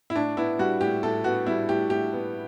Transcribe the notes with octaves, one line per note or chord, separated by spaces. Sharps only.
E4
A2 D4
B3 E4
G3 F#4
A2 G4
A2 A4
B3 F#4
G3 E4
A2 G4
A2 G4
B3